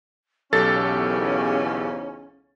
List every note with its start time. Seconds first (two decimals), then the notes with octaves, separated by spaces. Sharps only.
0.53 B1 E2 G#2 C#3 C#4 G4 A4 A6